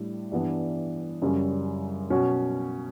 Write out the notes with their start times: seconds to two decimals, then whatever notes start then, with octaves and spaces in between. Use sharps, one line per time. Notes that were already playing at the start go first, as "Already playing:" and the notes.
Already playing: A2 G3 D4
0.32 G2 E3 B3 D4
1.22 F#2 C#3 G3 C#4
2.10 B2 F#3 C#4